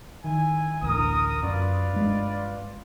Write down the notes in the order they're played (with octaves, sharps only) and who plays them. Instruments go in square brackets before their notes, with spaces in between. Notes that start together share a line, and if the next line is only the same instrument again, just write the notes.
[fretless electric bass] D#3 [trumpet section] E4 G#5
[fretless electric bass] A1 D2 A2 [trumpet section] A#4 D#6
[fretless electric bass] F#2 [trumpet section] F4 B4 D5
[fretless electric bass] G2 G#3